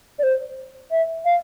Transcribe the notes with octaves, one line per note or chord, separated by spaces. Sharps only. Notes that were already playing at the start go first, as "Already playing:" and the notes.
D5
C5
E5
F5